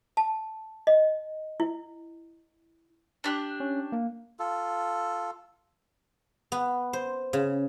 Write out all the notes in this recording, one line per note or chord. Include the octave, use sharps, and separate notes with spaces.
A5
D#5
E4
D4 G4 F#6
C#4
A#3
F4 A4
B3
C5
C#3